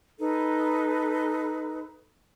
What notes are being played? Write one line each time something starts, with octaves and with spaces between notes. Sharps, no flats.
D#4 A4 B4